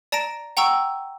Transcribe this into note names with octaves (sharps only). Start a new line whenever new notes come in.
D5 A5 A#5 A#6 D7
F#5 G5 A#5 C#6 E6